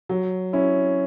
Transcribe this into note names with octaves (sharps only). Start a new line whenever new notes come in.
F#3
C#4 E4